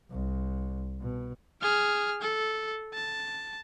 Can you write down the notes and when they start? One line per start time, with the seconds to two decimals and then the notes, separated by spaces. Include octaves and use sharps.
0.11 C2
1.02 B2
1.62 G#4 F6
2.22 A4
2.94 A5